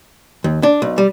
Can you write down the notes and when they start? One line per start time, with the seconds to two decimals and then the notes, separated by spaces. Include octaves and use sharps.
0.44 D#2
0.63 D4
0.82 B1
0.98 G3